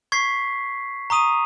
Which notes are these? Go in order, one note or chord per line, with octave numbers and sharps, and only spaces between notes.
C#6 G#6 B6 C7
A#5 C#6 D#6 D#7 F7